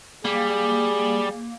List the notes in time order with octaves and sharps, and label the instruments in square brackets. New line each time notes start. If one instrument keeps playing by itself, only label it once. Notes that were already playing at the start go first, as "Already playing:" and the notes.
[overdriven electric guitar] G3 [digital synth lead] A#3 [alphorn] G#4